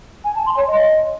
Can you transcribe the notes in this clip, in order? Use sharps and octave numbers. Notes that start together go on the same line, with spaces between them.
G#5
A5
C6
C#5
D#5